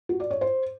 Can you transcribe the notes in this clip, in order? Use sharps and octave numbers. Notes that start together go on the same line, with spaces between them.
F#4
D5
C#5
C5